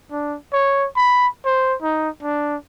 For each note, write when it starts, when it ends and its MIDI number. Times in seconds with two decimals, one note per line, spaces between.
0.11 0.36 62
0.53 0.87 73
0.96 1.27 83
1.45 1.75 72
1.82 2.09 63
2.23 2.56 62